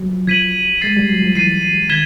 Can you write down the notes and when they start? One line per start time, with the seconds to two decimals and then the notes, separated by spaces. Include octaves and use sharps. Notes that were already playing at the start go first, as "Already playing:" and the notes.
Already playing: F#3
0.09 F3
0.27 F3 G#6 B6 D#7 F#7
0.81 G#3 A6 C7 D#7
0.97 G3
1.09 F#3
1.22 F3
1.35 E3 A6 C7 D#7
1.89 D#3 G#6 B6 E7 G7